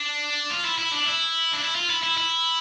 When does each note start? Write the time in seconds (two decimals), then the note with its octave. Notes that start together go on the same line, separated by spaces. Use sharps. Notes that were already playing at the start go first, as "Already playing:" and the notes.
Already playing: D4
0.50 F4
0.64 E4
0.78 E4
0.91 D4
1.05 E4
1.53 D4
1.61 E4
1.75 F4
1.90 E4
2.03 E4
2.18 E4